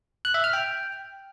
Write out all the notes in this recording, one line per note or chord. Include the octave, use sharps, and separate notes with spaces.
F#6
E5
F6
G5